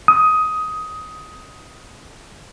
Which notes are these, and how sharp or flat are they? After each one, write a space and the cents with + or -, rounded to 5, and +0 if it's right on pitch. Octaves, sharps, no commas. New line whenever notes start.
D#6 +15